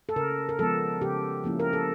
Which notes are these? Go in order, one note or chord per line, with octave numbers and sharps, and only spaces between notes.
A4
C#3 A#4
A#4
F3 G#3 B3 A4
C#3 G4
F3 A#3 C#4 E4
A#4
A4